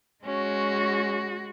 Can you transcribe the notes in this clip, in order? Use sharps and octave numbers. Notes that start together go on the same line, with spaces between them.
G#3 C#4 F#4